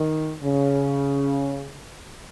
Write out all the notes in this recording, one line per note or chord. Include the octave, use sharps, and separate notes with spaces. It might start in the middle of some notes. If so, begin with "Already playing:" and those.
Already playing: D#3
C#3